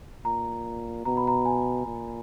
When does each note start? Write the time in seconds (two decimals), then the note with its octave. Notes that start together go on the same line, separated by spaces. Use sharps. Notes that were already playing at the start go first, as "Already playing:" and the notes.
0.25 A#2 A#5
1.05 B2 A#5
1.17 B5
1.27 A#5
1.46 G#5
1.86 A#2